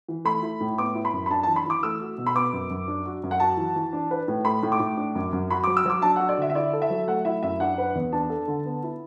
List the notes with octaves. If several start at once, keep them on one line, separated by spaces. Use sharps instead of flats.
E3
A3 B5
E4
A2
B3 D6
E4
B5
F#2
B5
D4 A5
E3 A5
B5
E3 D6
A3 E6
F#4
B2
B5
B3 D6
F#2
F#2
D4
F#4
F#2
F#5
F#4 A5
E3
E3
D4
B4
A2
A3 B5
A2
D6
A2
D4
F#2
F#2
F#4 B5
F#3 D6
E6
F#3 D6
D4 A5
F#5
F#4
D5
D3 E5
E5
E4 D5
A4
E5
F#3
A3 F#5
E4 E5
F#2 E5
D4 F#5
B4
E2
D4 A5
A4
D3
B3
E4